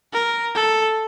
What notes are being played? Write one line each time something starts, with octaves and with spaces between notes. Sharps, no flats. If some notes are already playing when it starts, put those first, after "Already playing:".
A#4
A4